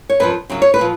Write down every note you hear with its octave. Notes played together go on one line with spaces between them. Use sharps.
C#5
F#2 F3 B4
F#2 C#3 F#3
C#5
B4
A#2 F3